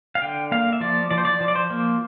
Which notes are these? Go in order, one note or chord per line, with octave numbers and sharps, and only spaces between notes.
F5
D3 G5
A#3 F5
E5
F3 D5
F3 D5
C5
D5
F3
D5
C5
A#3